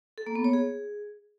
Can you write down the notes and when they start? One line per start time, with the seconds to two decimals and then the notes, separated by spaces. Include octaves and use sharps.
0.18 A4
0.27 A#3
0.35 B3
0.44 C#5
0.53 G#4